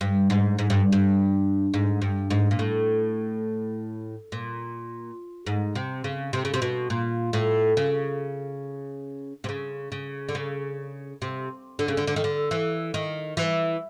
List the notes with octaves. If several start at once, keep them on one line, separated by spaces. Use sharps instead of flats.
G2
G#2
G#2
G2
G2
G#2
G2
G#2
A#2
A2
A#2
G#2
C3
C#3
C3
C#3
C3
B2
A#2
A2
C#3
C3
C#3
C#3
D3
C#3
C3
D3
C#3
D3
D3
D#3
D3
E3
D#3
E3